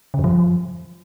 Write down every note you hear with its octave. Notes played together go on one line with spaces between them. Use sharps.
C#3
F#2
F3